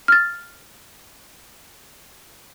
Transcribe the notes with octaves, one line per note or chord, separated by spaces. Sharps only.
F6 A6